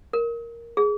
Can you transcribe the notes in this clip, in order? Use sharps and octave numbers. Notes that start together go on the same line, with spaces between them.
A#4
G#4